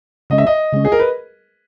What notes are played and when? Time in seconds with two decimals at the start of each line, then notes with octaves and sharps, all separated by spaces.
0.30 C#3 G#3 C#4 D#5
0.38 E5
0.47 D#5
0.73 C#3 G#3 C#4
0.85 G#4
0.92 A#4
1.00 B4